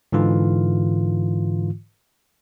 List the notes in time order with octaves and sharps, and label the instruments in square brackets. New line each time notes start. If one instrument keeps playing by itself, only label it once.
[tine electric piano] G#2 D3 E3 F4